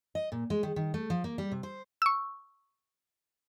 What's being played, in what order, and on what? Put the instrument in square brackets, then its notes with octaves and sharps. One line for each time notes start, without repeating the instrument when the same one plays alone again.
[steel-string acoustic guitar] D#5
A#2
G#3
D#3
D#3
A3
F3
A#3
G3
C3
C5
[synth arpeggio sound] C#6 E6